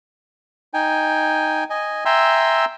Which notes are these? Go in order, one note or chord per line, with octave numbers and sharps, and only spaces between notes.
D#4 G5 G#5
D#5 G#5
E5 G5 G#5 A#5 C6 E6